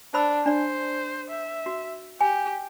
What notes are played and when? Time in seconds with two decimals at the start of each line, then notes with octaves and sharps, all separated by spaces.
0.14 D4 C5 B5 E6
0.46 D4 C5 D5
1.30 E5
1.66 F#4
2.21 G4 G#5